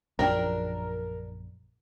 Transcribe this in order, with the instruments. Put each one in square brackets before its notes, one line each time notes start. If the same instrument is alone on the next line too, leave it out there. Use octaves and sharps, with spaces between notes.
[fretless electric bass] A#1 F#2 [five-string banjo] D4 G5 [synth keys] A#4